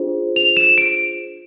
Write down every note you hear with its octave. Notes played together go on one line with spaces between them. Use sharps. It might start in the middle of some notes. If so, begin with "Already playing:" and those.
Already playing: D4 F4 G#4 C5
F7
E7
D7